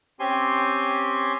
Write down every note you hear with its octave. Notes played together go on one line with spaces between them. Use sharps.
C4 C#4 G4 G#5 C6